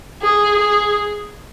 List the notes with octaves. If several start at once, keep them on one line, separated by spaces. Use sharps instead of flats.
G#4
G#4